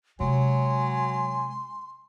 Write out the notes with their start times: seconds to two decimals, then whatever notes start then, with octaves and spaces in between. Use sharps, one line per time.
0.20 C3 F#3 G#3 G#5 C6